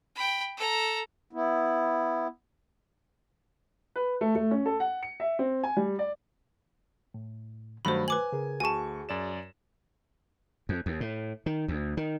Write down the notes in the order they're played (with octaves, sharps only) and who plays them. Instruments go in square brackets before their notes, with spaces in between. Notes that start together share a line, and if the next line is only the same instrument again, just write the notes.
[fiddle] G5 B5
A4 A#5
[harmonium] B3 E4
[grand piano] B4
A3
A3
C#4
A4
F#5
C#7
E5
C4
G#5
G3
D5
[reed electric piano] A2
[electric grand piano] G2 F#3 [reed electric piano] D#3 A3 F#4 [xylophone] C5 B5
[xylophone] B4 D6 F#7 [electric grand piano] G#5
[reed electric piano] C#3 G#4 A#4
[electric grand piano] D2 C#6 [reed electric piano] F#4 G#4 [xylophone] G#5 A5
[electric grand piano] F#2 D5 E7
[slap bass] F2
D#2
A2
D#3
D2
D#3